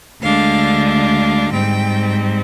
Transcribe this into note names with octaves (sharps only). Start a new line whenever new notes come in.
D2 D3 G#3 D4 F5
F5
G#2 G3 C4 G5